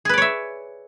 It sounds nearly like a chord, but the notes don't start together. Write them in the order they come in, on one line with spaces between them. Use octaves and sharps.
G#4 B4 D5 C#5 E5